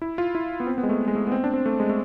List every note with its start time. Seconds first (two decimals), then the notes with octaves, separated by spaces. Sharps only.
0.02 E4
0.18 F4
0.35 E4
0.60 B3
0.67 C4
0.78 B3
0.83 G#3
0.89 A3
1.08 G#3
1.16 A3
1.27 B3
1.32 C4
1.44 D4
1.53 C4
1.66 A3
1.80 G#3
1.89 A3